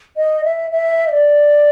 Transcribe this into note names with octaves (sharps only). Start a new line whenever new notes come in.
D#5
E5
E5
D#5
D5